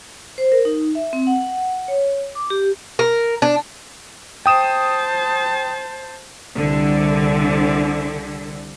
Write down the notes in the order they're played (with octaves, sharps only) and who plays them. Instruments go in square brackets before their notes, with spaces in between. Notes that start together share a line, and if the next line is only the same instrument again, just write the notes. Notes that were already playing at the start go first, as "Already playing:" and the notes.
[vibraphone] C5
A#4
D#4
E5
C4
F#5
F#5
C#5
D6
G4
[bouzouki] A#4
D4
[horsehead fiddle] C5 A5 [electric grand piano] G5 D#6 E7
[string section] C2 D3